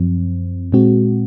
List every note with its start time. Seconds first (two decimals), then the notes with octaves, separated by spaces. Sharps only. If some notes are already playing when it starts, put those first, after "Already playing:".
Already playing: F#2 F3 C4
0.72 A#2 G#3 C4 F#4